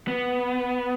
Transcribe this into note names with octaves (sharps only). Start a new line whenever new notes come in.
B3